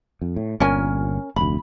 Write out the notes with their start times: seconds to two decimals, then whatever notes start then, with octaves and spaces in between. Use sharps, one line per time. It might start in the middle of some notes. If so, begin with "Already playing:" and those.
0.21 F2
0.36 A2
0.60 G1 A#2 C#4 A#4 G#5
1.36 F1 D2 B5